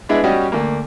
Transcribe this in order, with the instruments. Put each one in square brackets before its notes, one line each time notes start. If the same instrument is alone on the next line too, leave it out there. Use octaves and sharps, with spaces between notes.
[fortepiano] G#3 B3 D4 E4 G#4
G3 C#4 F#4 G4 D5 D#5
D2 A#3